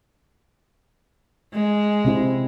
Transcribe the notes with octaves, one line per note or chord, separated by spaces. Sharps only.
G#3
C3 C4 E4